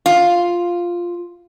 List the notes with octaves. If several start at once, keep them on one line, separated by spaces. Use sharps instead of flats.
F4